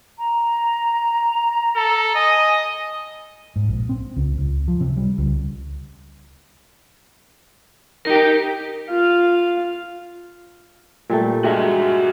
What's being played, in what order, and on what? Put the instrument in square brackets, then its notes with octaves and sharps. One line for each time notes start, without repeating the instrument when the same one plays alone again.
[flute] A#5
[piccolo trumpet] A4
[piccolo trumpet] D#5 [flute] G#5
[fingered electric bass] G#2
A#1
C4
C#2
C#2
F3
C3
G3
C#2
[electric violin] D#4 G4 [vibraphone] A#4
[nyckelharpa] F4 F5
[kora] A#2 G3 A3
[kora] G2 G#3 [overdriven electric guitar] F#4 E5